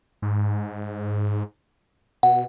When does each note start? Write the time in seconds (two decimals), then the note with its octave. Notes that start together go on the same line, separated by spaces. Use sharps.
0.22 G#2
2.23 B2 F#5